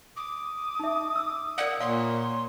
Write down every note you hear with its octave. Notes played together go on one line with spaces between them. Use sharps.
D6 D#6
D#4 E5
E6
A#4 D5 F5 F#5
A#2 C#5 F5 C6